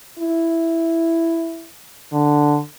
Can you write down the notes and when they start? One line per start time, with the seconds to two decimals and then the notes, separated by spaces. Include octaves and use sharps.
0.19 E4
2.12 D3